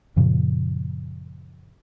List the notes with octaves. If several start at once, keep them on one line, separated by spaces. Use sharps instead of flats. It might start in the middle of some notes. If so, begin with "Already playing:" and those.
F#2 A#2 C#3 F3